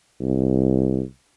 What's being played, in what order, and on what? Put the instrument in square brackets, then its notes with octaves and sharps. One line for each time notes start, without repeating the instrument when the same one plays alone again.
[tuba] C2